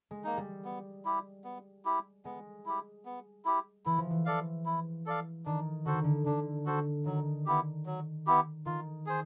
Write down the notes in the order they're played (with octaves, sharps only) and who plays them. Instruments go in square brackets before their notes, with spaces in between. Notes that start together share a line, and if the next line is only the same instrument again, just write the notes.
[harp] G#3
[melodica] A#3 D#4
[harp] G3
[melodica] B3
E4 G4
B3
E4 G4
[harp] G#3 [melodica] B3
[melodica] E4 G4
B3
E4 G4
[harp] E3 [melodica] E4
[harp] F3
E3
[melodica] A4 D5 F5
E4
A4 D5 F5
[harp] D#3 [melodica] D4
[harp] D3 [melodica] F#4 A4 C5
[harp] D#3
D3
[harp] D3 [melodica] D4
[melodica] F#4 A4 C5
[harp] D#3 [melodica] F#3
[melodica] B3 E4 G4
F#3
B3 E4 G4
[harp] D#3 [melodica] F4
[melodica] G#4 C5